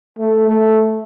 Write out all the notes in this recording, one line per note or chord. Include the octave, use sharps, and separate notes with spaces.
A3
A3